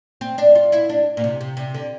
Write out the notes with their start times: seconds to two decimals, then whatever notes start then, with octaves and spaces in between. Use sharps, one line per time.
0.21 C4
0.38 D4
0.55 F4
0.72 E4
0.89 D4
1.17 A#2
1.24 C3
1.41 C3
1.57 C3
1.74 D3